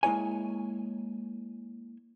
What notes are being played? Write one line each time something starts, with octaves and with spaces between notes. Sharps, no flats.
G#3 A#3 E4 C#5 G#5